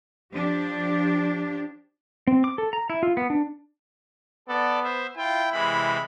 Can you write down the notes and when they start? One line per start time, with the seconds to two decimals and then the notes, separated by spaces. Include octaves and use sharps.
0.33 F3 D4 G4
2.27 C4
2.44 D6
2.58 A4
2.73 A#5
2.90 E4
3.03 F4
3.17 B3
3.30 D4
4.48 B3 A4 D5
4.84 C5 E5
5.17 E4 F4 G5
5.52 C3 E3 G#3 B5